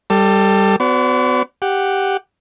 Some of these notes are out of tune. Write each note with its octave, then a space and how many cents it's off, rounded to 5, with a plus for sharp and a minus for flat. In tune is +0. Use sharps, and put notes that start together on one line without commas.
G3 +0 A4 +20
B3 +40 F#4 -5 D5 -40
G4 +0 F#5 +0